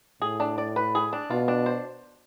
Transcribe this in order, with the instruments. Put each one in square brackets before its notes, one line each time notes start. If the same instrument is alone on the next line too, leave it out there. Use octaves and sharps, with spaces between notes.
[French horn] A2 [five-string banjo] G#4
[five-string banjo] D4
D5
B4
G#4
D4
[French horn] B2 [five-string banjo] F4
[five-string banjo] D4
C5